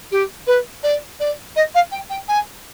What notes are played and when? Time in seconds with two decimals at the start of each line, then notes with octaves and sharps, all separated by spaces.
0.11 G4
0.46 B4
0.83 D5
1.19 D5
1.55 D#5
1.74 F5
1.91 G5
2.09 G5
2.28 G#5